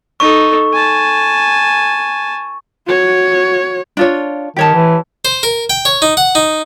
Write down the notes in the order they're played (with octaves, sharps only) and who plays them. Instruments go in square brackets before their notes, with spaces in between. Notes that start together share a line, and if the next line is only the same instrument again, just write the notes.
[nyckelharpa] D#4 A4 [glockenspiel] C#6
[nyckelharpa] G#5 A5
[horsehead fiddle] F#4 C#5
[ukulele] D4 F4 C#5
[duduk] D#3 [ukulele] G4 C#5 A5
[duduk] E3
[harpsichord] C5
A#4
G5
C#5
D#4
F#5
D#4